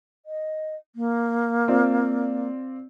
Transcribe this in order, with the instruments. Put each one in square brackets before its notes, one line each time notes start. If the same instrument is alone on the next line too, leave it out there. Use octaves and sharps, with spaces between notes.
[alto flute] D#5
A#3
[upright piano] C4 F4 D5